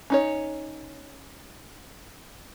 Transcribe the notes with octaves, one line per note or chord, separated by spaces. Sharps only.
C#4 D#4 C#5